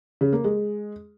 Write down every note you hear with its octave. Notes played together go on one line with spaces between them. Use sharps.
C#3
A#3
G#3